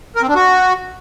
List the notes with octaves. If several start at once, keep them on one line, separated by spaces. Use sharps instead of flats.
A#4
C4
D4
F#4